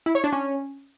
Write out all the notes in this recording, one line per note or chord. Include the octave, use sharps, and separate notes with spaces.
E4
C#5
D4
C#4